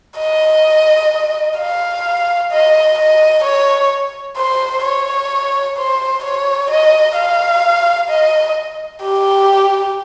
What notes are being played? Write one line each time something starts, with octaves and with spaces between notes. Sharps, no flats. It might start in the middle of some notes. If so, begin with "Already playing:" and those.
D#5
F5
D#5
D#5
C#5
C5
C#5
C5
C#5
D#5
F5
D#5
G4